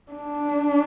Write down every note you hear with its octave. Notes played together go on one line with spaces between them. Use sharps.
D4